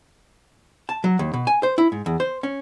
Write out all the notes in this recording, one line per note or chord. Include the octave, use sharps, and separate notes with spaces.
A5
F#3
D#2
B2
G#5
C5
E4
G#2
E2
C5
C#4